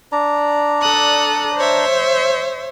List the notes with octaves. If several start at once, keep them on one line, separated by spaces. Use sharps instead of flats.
D4 D5 A#5
A4 D#6 F#6
C5 C#5 E5